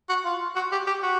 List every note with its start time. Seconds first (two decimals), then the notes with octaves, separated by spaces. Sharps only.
0.09 F#4
0.25 F4
0.56 F#4
0.72 G4
0.87 G4
1.03 F#4